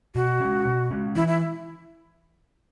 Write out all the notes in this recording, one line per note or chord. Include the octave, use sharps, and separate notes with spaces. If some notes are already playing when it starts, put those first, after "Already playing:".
B2 F#4
G#3 C#4
B2
G#3 C#4
E3 E4
E4